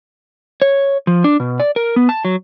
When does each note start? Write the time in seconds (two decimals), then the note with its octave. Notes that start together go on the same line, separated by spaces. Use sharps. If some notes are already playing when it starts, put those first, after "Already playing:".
0.62 C#5
1.07 F3
1.24 D4
1.40 B2
1.60 D5
1.76 A#4
1.96 B3
2.09 A5
2.25 F#3